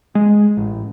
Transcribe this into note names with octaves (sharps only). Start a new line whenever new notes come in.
G#3
A1